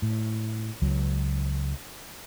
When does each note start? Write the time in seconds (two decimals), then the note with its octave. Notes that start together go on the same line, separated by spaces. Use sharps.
0.02 A2
0.82 C#2 F#3